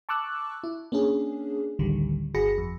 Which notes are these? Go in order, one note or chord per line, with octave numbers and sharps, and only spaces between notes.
A5 C#6 D6 E6 F#6
E4
A#3 C#4 D4 G#4
A1 D2 D3 D#3 G3
G1 F#4 G#4 B5 A#6 C#7
F2